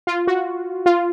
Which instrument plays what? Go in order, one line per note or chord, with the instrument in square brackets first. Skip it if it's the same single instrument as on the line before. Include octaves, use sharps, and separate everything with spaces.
[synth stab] F4
F#4
F4